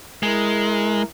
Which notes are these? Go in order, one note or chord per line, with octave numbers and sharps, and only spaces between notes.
G#3 E4 A#4